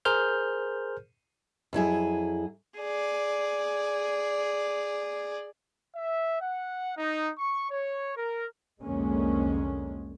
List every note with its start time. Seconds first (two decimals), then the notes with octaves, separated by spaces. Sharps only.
0.05 G#4 A#4 C5 F6 G6
1.73 F2 F#3 E4 G#4
2.79 G#4 D5
5.94 E5
6.40 F#5
6.97 D#4
7.37 C#6
7.70 C#5
8.16 A#4
8.82 C2 F2 D3 G#3 A#3 C#4